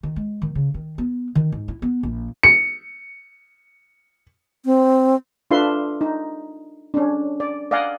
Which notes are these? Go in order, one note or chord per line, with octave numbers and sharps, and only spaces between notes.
D#3
G#3
D#3
C#3
D#3
B3
D#3
G#2
E4
B3
A#1
C#7
C4
D4 F4 A4 B4 E5 C6
D#4
C#4 D4
D5
D5 D#5 F5 F#5 G#5